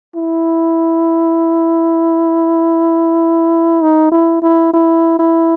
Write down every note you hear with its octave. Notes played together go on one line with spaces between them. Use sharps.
E4
D#4
E4
E4
E4
E4